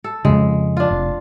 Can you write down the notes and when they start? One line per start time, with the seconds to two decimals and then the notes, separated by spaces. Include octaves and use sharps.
0.04 A4
0.25 F2 C#3 G#3
0.77 D4 F4
0.90 F1